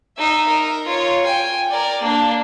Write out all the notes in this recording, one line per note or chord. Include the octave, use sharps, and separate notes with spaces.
D#4 E5
A#4
F4 C#5
G5 G#5
A#4 D5
A#3 D4